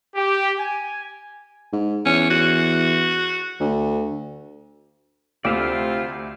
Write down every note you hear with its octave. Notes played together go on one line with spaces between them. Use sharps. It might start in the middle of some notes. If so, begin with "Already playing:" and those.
G4
G#5
G#2
E2 C#4
F#4
D2
D2 C3 F4 D5 E5 F5